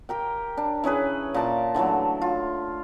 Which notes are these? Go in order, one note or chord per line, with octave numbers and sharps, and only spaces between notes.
G4 A#4 G5
D4
E3 C#4 G#4 B4
A#2 A5 D6
D3 E3 F#3 A3
F4